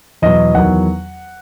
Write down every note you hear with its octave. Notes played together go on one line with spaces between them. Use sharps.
E2 B2 F#3 D#5
E2 D#3 F#3 F#5